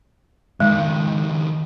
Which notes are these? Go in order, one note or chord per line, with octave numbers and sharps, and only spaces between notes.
C#2 D#3 G#3